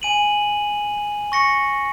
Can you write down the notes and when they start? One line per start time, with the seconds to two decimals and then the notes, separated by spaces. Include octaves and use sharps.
0.02 G#5 D#7 F#7
1.32 C#6 A#6 C#7